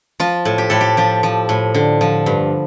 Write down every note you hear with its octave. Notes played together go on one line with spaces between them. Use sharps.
F3 F4
A2
G4
A2 A4
G4
F3 G4
F3
A2
D3
F3
G2